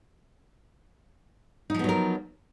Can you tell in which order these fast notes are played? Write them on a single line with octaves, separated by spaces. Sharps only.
D#4 F3 B3 F#3 A#4